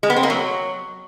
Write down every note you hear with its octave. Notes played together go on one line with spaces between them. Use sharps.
G#3
B3
C4
A#3
F#3